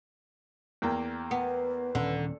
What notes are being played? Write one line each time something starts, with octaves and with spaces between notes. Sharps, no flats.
E2 A#3 G5
B3 B4
D#1 D3 C#4